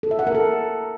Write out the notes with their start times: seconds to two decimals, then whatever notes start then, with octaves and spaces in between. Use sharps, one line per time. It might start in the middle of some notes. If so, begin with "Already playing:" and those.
0.03 A4
0.11 E5
0.19 F#5
0.27 A#4
0.35 A4